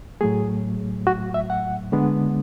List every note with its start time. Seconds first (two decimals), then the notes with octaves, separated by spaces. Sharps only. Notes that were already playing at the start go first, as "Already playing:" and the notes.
0.21 A2 F#3 A3 G#4
1.07 F#4
1.34 E5
1.50 F#5
1.92 D3 G#3 B3 D4